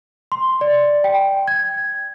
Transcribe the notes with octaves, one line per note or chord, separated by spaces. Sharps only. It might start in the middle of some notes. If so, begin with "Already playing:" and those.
C6
D5
G5
G#6